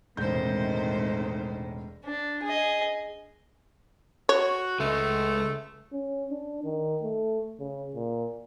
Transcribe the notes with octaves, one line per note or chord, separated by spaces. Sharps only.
E1 A2 C3 D#3 G#3 C5 G6
D4
G#4 D#5
F#4 C#5
C#2 G#3 A3
C#4
D4
D#3
A3
C#3
A#2